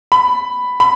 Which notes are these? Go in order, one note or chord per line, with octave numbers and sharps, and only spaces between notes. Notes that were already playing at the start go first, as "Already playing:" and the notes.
B5
B5